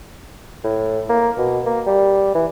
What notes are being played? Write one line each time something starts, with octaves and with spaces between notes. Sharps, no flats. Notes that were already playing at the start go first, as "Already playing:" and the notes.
A2
A#3
B2
A#3
G3
E3